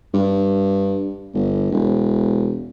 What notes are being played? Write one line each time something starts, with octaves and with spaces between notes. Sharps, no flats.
G2
G1
E1